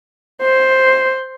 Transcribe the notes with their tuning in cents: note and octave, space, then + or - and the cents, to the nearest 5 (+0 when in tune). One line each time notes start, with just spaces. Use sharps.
C5 +5